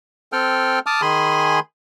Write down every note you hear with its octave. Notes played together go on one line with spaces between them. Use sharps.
C4 A4 G5 F6
A5 D6 D#6 F6
D#3 G#4 G#5 B5 C6